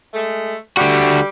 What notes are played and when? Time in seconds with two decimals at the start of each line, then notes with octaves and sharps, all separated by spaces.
0.14 G#3 A3
0.77 D3 G3 F#4